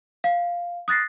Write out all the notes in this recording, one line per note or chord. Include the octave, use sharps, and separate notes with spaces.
F5
D#6 F#6 A6 A#6 C7